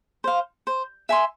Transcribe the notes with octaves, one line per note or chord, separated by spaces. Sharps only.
C5 F5
C5
E5 G#5 C6